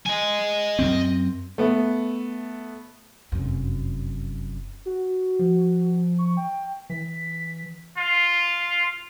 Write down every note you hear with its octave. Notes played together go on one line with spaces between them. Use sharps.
D#5 G#5
F#2 C4
A3 B3
F1 F#2
F#4
F3
C#6
G5
E3 B6
F4